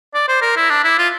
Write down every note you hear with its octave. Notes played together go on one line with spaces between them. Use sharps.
D5
C5
A#4
E4
D4
E4
F4